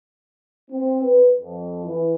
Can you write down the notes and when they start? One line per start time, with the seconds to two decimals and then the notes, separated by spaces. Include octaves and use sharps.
0.70 C4
1.02 B4
1.39 F2
1.84 E3